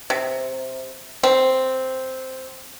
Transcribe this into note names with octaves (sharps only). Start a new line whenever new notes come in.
C3
C4